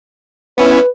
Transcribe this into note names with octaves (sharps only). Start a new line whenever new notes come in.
B3 C#4 E4 B4